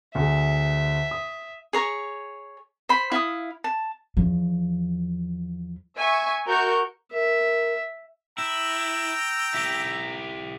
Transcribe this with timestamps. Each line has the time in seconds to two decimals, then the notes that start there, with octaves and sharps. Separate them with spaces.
0.15 D2 G#4 E5
1.11 D#6
1.73 G#4 C#5 A#5
2.89 C5 B5
3.12 E4 F5 G#5 D#6
3.64 A5
4.17 E2 F3
5.95 E5 G#5 C#6
6.48 F#4 A#4 C#6 G6
7.13 A#4 E5
8.38 E4 G5 A#5 E6
9.54 E4 G4